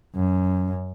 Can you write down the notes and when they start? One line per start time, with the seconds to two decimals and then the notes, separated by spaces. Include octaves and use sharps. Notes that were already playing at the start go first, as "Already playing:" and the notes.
0.15 F#2